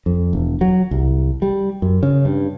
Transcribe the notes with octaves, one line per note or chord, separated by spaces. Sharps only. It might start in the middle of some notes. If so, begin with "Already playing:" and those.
F2
E1
F#3
C2
G3
F#2
C#3
G2